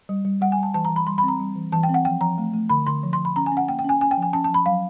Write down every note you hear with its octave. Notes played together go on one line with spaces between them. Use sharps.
G3
G3
G3 F#5
G#5
G3 A5
E3 A5
A#5
E3
B5
G3 C6
B5
C4
A#5
G3
E3
E3 A5
G5
C4
F#5
F3 G5
F3 A#5
A3
A3
D3 B5
D3 C6
F3
C6
F3
B5
C#4 A#5
G#5
C#4 F#5
A#3 G5
G5
C#4 G#5
C#4 G#5
G5
F3 G#5
C#4 A5
A5
F3 B5
F#3 F5